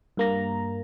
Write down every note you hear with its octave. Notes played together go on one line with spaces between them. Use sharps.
G2 A#3 A#5